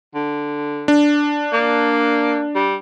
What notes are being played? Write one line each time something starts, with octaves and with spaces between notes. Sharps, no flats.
D3
D4
A#3
G3